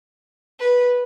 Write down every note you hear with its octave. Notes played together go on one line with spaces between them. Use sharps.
B4